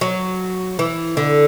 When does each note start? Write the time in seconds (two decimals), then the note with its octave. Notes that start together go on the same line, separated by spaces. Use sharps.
0.01 F#3
0.79 E3
1.17 D3